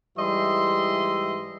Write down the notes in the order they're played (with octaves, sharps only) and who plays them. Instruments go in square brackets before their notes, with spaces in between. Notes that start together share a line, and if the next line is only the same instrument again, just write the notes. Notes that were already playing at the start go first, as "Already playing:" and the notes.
[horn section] G#2 E3 G3 D#5 E5 C6